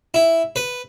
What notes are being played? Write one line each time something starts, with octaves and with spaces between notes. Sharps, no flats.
E4
B4